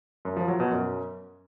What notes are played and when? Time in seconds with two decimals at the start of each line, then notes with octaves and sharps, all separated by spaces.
0.25 F#2
0.36 F3
0.48 F#3
0.60 B2
0.71 F#2